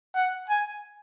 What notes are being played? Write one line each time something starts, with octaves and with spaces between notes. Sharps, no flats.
F#5
G#5